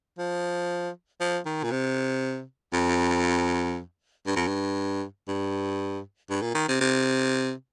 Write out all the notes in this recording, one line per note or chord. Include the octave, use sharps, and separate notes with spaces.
F3
F3
D#3
A#2
C3
F2
G2
F2
G2
G2
G2
A#2
D#3
C3
C3